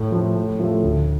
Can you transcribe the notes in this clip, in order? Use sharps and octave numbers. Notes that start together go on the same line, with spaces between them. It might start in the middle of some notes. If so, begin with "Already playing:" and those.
Already playing: A2
F3 A3
A2
F3 A3 F4
D2